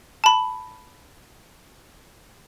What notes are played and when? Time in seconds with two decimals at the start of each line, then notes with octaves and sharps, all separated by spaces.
0.24 A5 B5